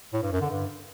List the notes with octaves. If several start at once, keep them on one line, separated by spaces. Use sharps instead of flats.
A2
G2
F#2
D3
G2